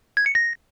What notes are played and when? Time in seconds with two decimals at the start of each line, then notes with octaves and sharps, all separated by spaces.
0.17 G#6
0.26 C#7
0.35 A#6